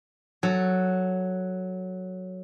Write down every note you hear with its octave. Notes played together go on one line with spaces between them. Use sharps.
F#3 A4